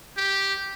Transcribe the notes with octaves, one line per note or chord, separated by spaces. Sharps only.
G4